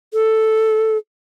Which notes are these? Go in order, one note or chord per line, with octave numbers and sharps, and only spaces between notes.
A4